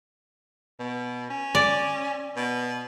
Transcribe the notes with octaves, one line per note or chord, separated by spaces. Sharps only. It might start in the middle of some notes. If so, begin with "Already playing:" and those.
B2
C#4
D5
B2